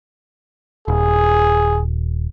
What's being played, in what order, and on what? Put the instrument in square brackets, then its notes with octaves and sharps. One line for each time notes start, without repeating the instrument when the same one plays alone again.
[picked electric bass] D#1 [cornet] G#4